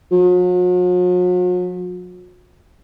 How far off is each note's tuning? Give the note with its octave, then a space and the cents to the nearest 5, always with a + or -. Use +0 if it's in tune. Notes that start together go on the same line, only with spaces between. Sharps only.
F#3 -45